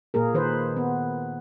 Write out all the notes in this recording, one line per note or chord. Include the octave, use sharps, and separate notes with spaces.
A#2 A#3 G#4 A#4
D#3 B4 C5
B3